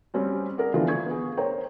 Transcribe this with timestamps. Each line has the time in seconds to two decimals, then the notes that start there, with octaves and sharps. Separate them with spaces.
0.14 G3 C4 C#4 F#4
0.58 G#4 A#4 D5 F#5
0.74 D3 E3 F3 B3 D4 F4
0.88 C#6 G#6
1.06 B3 G#4
1.37 A#4 C5 C#5 G5 A#5